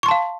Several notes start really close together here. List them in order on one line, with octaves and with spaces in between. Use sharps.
C#6 C6 A5 F5